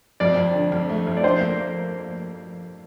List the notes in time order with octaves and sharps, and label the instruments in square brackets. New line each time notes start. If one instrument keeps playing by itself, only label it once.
[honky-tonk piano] F2 [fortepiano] D5
[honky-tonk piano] F2
D3
F2
A3
F2
[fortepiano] D5
[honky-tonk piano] D4 [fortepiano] C5
[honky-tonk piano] A#3